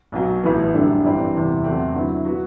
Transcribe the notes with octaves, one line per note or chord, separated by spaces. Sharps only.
B1 B2 F#3
A1 A2 E3 B3
F#2 D3 G3 D4 A4
G1 G2 E3 G3 C4
E2 C3 E3
E2 C3 F#3 A3 C4
D3 F#3 B3 E4
F#3 B3 F#4 B4